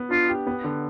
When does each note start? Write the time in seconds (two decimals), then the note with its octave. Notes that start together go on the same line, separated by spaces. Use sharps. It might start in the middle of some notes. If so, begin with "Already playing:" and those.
Already playing: B3
0.10 D4 F4
0.29 G4
0.47 B3
0.64 D3